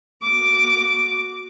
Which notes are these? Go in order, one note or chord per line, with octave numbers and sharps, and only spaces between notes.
F#4 D6